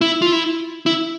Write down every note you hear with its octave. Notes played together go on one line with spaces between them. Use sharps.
E4
F4
E4
E4